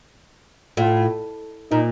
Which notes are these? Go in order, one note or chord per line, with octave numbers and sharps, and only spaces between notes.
A2 F4
A#2 D#4